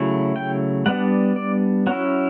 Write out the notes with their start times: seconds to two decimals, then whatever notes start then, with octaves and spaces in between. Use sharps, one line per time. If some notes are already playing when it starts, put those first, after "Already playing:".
Already playing: C#3 F#3 A3 E4
0.36 G5
0.86 G3 B3 D4 F#5
1.36 D5
1.87 F#3 C#4 E4 F#4